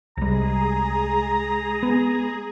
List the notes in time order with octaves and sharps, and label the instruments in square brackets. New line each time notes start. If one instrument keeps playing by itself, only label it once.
[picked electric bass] C2 G3 [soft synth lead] G#3 [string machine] G#4 [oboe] A#5
[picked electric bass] B3